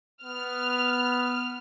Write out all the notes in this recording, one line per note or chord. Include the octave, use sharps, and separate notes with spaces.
B3 F6